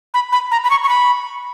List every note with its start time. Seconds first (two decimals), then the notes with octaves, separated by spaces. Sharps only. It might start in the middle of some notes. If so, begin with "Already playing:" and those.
0.14 B5
0.32 B5
0.51 A#5
0.64 B5
0.70 C#6
0.84 C#6
0.89 B5